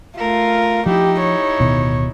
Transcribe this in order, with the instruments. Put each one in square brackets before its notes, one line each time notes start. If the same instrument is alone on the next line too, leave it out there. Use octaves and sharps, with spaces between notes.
[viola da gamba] A3 A#4 [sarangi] F4
[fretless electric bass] F3 [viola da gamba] D#4 E4 [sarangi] G4
[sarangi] C#5
[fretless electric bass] D1 B2 D#3